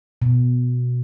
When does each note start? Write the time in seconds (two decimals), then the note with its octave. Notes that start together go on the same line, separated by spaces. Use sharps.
0.22 B2